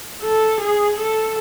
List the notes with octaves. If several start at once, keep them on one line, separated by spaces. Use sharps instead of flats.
A4
G#4
A4